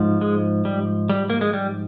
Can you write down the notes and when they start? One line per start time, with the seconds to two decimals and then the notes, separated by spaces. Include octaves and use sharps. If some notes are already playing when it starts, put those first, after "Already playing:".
Already playing: G#2 F3
0.21 G#3
0.65 G3
1.10 G3
1.30 A#3
1.41 G#3
1.53 G3